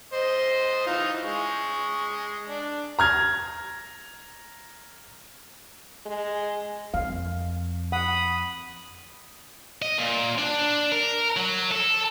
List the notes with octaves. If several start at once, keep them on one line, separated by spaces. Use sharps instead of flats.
C5 D#5
E3 D#4 F4
G#3 C#6
D4
A#5 F6 G#6
G#3
F2 F5
F#5 B5 D#6
D#5
A#2
D4
A#4
F#3
A4